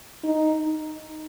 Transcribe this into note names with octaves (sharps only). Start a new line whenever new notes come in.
D#4